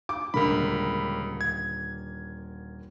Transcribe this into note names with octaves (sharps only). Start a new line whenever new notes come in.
D6
D#1 C#2 D3 A#4 B5
G#6